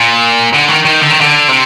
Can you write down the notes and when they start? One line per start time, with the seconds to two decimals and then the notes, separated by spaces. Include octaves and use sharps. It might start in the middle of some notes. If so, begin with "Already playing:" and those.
Already playing: A#2
0.54 D3
0.69 D#3
0.85 D#3
1.01 D3
1.11 D#3
1.21 D3
1.48 C3